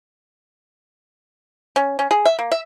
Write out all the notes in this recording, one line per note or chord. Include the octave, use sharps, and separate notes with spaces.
C#4
C#4
G#4
E5
A#3
E5